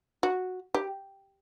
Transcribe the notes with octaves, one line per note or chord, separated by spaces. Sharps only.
F#4
G4